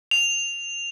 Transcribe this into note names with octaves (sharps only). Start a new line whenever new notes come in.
F7